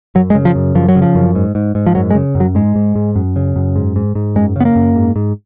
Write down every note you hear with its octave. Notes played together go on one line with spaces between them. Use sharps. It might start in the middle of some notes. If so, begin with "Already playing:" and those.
F#2 F#3
G#3
C#3
F3
F#2
F#2 F3
F#3
C#3
F3
F#2
G#2
G#2
G#2
F3
F#2 F#3
G#3
C#3
F#2
F#3
G#2 G#3
G#2
G#2
F#2
C#3
F#2
G#2
G#2
G#2
F#2 G#3
C#3 B3
A#3
F#2
G#2
G#2